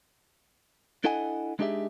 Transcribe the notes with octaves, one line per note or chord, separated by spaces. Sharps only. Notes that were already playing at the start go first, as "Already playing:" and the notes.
D4 E4 A4 D#5 F#5 G#5
G#3 D4 D#4 G4 G#4 E5